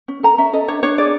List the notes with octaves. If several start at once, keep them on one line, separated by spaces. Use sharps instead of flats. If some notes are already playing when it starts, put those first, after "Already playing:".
C#4
A4 A#5
C#4 E5
A4 D#5
D4 C#5
D4 C#5
G#4 D5